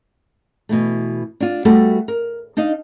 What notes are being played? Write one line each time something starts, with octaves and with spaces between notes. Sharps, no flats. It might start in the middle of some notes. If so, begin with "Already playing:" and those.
B2 E3 A3
D4 F4
G3 A3 B3 F#4 A4
A#4
D4 D#4 D#5 F5